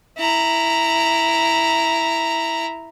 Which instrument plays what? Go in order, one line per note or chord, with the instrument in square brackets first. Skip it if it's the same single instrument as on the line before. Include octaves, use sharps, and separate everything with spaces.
[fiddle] E4 A#5